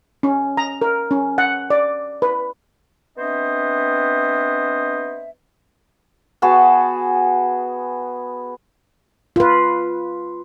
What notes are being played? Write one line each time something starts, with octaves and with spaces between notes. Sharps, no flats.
C#4
A#5
A#4
C#4
F#5
D5
B4
B3 C4 D4 C5 D#5 E5
B3 F#4 G#4 A5
F4 B4